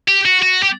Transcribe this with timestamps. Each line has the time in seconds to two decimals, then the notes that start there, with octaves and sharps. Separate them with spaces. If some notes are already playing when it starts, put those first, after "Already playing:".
0.08 G4
0.26 F#4
0.43 F#4
0.63 G4